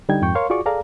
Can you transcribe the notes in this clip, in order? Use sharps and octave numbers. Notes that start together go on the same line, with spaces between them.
D3 G3 D#4 G5 G#6
F2 G#2 G5 C#6 G6
A#4 C#5 F5 C6 C#6
F4 F#4 G#4 D5 C#6 D6
G#4 A4 D5 F5 A#5